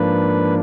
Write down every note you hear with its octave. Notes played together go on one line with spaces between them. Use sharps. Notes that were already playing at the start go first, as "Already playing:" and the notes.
Already playing: G#2 F3 A#3 D4 B4